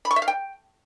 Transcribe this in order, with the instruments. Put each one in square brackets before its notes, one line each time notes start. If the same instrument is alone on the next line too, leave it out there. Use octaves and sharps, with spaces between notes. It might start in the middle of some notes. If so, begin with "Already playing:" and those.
[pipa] B5
C#6
E5
F5
G5